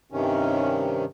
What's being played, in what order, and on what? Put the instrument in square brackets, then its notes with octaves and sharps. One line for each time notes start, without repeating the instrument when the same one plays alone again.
[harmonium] G2 C3 D#3 C#4